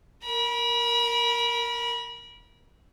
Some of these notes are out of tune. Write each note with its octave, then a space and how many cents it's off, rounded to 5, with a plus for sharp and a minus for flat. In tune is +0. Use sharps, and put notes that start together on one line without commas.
A#4 +0 B5 -35